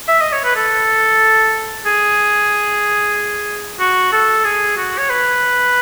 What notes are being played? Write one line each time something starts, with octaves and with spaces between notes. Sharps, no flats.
E5
D#5
C#5
B4
A4
G#4
F#4
A4
G#4
F#4
C#5
B4